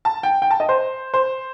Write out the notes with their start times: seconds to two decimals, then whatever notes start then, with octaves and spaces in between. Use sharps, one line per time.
0.05 A5
0.23 G5
0.42 G5
0.51 A5
0.60 D#5
0.69 C5
1.14 C5